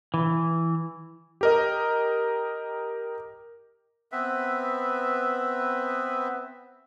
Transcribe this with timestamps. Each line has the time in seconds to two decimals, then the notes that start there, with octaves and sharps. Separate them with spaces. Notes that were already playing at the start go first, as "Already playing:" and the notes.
0.14 E3
1.41 G4 A#4 D#5
4.12 B3 C4 B4 E5